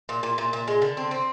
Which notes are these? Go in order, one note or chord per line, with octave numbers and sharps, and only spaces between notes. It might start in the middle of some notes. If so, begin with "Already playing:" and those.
A#2
A#2
A#2
A#2
G#3
D3
C4
C4